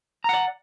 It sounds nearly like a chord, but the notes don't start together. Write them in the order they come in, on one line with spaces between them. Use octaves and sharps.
A#5 F#5 D5